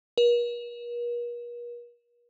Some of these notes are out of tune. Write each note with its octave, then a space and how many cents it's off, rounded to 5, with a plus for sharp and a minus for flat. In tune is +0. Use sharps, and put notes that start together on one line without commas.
A#4 +45